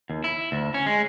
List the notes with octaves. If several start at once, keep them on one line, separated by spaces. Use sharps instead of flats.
D#2
E4
D2
C#4
G#3